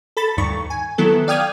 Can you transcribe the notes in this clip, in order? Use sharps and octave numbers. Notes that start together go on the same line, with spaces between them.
A4 B5 A6
D2 G2 D#3 C#6
G#5
D#3 F#3 B3 E4 A4
D5 F5 G5 D#6 F6 G#6